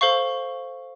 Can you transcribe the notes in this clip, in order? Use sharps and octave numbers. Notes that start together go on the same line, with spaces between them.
A4 C5 F5 C#6